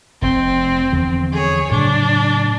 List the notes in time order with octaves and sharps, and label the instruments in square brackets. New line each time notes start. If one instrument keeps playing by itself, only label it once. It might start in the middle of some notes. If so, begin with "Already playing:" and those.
[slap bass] F1 [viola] C4
[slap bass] E2 D3 F3
[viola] G#4 C#5
[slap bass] A2 C#3 F#3 [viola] D4